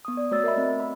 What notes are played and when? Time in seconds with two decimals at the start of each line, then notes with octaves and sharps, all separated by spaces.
0.05 B3 D#6
0.17 D5
0.31 A3 F#4 C#5 D5 E6 A6
0.44 A#4 D#5 E5 B5
0.56 A3 C4 D#5
0.80 B5